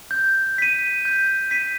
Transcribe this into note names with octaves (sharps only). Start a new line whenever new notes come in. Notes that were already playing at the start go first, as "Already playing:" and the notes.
G6
B6 D#7
G6
B6 D#7